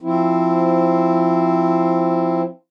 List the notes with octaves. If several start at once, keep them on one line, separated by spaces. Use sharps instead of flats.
F3 C4 E4